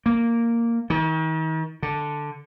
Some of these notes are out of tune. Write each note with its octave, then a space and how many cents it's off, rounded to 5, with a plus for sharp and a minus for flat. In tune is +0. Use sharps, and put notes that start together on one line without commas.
A#3 -5
D#3 +40
D3 +0